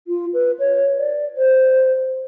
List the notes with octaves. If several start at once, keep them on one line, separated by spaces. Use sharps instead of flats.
F4
B4
C#5
D5
C5